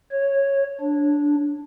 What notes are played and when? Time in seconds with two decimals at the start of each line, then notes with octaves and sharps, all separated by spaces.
0.11 C#5
0.81 D4